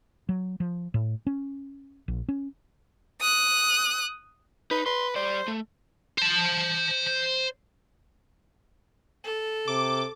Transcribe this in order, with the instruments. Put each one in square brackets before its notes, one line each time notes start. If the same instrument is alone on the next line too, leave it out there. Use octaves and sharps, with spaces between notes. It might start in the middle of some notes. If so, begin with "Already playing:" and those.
[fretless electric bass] F#3
F3
A2
C#4
A#1
C#4
[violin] D#6 F#6
[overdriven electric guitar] D#4 [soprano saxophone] B4
[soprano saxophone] B4 [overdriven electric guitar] C6
[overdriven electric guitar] G3 D5 [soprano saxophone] C5
[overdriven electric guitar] A3
[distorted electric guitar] C5 A5
[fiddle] A4
[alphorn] C3 [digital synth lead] D6